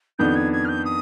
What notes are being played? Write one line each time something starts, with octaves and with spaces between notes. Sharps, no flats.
F2 D#3 B3 D4 G6
G#6
G#6
F6
G6
D#6